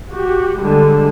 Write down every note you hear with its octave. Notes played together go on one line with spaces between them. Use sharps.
F#4 G4
D3 G3 G#3